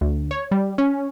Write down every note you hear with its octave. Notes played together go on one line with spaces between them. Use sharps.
D2
C#5
G3
C#4